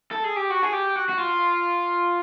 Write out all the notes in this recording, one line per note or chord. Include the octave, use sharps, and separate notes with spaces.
A4
G#4
G4
F#4
G#4
G4
F#4
F#4
F4